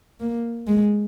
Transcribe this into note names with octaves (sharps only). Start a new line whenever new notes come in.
A#3
G#3